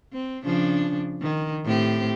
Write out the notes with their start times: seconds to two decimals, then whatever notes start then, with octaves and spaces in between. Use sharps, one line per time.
0.13 C4
0.43 C#3 F3 D4
1.22 D#3
1.64 A2 C4 G4